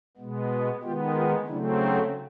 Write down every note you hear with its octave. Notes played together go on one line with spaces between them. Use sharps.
B2 G#3 B3
D#3 G#3 B3 F4 G4
D#4 F4
C#3 F#3 A3 C4 D4 E4
D#4